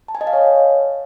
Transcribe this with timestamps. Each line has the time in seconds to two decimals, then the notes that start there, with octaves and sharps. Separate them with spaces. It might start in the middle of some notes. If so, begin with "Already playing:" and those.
0.08 A5
0.15 G#5
0.21 D#5
0.27 F5
0.33 C#5